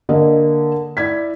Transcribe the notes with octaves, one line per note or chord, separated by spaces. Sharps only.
D3 A#3 D#5
E4 D5 G#6 B6